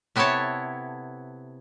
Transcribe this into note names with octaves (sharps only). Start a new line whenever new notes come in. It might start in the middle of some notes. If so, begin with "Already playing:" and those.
C3 B3 E4 A4 C#5 A5